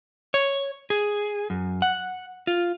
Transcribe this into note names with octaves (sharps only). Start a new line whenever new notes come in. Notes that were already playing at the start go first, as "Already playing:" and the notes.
C#5
G#4
F#2
F#5
F4